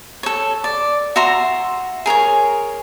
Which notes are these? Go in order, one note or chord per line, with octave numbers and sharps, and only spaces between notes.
A4 C#5
D5
F#4 E5 A#5 C6
G#4 A#4 B4 C#5